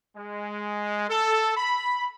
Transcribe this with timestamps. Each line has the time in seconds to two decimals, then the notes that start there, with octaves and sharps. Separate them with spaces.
0.16 G#3
1.09 A4
1.57 B5